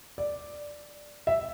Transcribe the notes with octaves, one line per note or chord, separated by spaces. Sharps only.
D5
E5